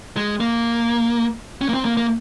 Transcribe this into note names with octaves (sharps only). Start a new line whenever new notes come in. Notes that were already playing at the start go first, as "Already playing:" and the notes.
G#3
A#3
C#4
A#3
C4
A#3
A#3